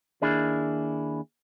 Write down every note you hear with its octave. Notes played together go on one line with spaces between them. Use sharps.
D#2 A#3 D4 E4 G#4